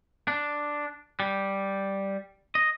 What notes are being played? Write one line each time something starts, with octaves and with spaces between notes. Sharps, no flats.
D4
G3
D#5